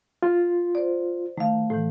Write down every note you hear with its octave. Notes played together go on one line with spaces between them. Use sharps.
F4
C5 D5
D#3 A3 F5
A2 E3